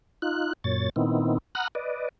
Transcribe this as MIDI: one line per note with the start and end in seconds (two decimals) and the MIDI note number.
0.22 0.53 63
0.22 0.53 65
0.22 0.53 90
0.64 0.90 42
0.64 0.90 46
0.64 0.90 73
0.64 0.90 93
0.96 1.38 46
0.96 1.38 51
0.96 1.38 59
0.96 1.38 60
0.96 1.38 63
0.96 1.38 64
1.55 1.68 78
1.55 1.68 82
1.55 1.68 83
1.55 1.68 87
1.55 1.68 89
1.55 1.68 90
1.75 2.09 71
1.75 2.09 74
1.75 2.09 75